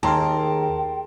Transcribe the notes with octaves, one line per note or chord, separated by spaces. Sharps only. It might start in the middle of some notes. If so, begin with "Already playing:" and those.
D#2 G#4 A#4 G5 A5 A#5 C6